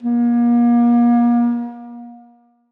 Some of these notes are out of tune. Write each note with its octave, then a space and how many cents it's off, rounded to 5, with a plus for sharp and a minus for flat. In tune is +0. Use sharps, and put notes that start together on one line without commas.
A#3 +35